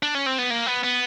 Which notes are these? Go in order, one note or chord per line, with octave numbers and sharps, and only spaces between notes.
D4
C#4
C4
B3
A#3
B3
B3